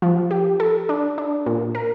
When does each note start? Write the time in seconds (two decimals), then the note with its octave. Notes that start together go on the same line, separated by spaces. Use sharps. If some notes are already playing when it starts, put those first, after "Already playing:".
0.02 F3
0.31 G4
0.60 A4
0.89 D4
1.18 D4
1.46 A#2
1.75 A#4